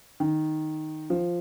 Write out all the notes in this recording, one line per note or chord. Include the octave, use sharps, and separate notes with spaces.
D#3
F3